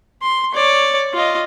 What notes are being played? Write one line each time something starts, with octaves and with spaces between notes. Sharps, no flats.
C6
C#5 D5
F4 D#5